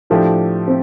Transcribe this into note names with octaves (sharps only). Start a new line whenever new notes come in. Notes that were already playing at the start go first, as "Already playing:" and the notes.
A2 F3 A3 D4 G4
C4